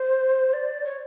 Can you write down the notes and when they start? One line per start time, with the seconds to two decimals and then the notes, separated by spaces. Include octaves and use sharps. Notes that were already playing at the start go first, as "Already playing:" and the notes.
Already playing: C5
0.54 D5
0.85 C#5